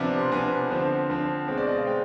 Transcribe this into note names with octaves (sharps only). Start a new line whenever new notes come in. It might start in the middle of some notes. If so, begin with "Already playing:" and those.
Already playing: C3 F3 B3 D4
C6
C3 F3 B3 D4 G#5
D3 F3 C4
D3 F3 C4
B2 G#3 C4
D5
D#5
F5
G#3 C4 G5